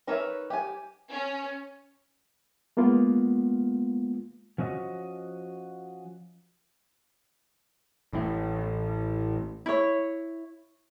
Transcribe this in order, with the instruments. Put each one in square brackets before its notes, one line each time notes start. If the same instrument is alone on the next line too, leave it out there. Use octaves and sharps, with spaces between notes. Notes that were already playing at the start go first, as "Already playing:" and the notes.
[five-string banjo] D#4 A#4 B4 C#5 E5
G4 G#5
[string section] C#4
[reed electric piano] G#3 A#3 B3 F4
[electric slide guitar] F3 C#4 F#4 D#5
[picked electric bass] A1 A2
[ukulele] E4 C#5